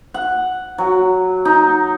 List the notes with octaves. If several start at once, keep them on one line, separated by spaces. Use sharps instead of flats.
F#5
F#3
D#4